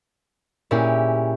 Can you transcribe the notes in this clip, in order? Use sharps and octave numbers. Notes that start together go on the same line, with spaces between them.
A#2 C#4 E4 G4 G#4